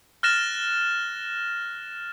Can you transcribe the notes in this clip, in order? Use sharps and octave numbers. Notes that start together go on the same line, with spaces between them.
F6 F#6 A6 A#6 E7